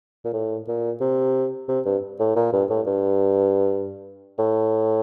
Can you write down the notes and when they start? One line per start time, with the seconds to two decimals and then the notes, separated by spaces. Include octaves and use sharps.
0.25 A#2
0.33 A2
0.68 A#2
1.01 C3
1.68 C3
1.85 G2
2.20 A2
2.36 A#2
2.53 G2
2.70 A2
2.87 G2
4.39 A2